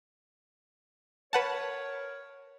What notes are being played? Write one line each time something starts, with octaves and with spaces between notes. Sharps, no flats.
A#4 B4 C#5 F#5 A5